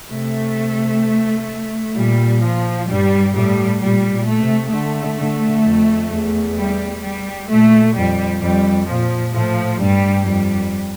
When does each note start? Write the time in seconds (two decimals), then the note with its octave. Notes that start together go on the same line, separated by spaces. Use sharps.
0.10 C3 A3
1.95 A#2 G3
2.42 F3
2.87 G2 G3
3.33 A2 G3
3.80 A#2 G3
4.11 A#2
4.26 A3
4.42 C3
4.71 D3 A3
5.18 D3
5.65 F2
6.10 E2
6.56 G3
7.02 G3
7.48 A#2 A3
7.95 F2 G3
8.41 F2 G3
8.87 A#2 F3
9.33 A2 F3
9.79 G2 G3
10.25 F2 G3